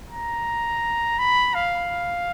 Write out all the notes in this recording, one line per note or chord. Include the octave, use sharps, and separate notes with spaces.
A#5
B5
F5